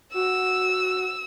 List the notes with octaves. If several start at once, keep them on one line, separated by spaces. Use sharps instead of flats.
F#4 E6